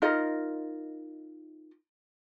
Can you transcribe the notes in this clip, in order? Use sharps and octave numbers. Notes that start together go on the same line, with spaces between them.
D#4 F4 A#4 D#5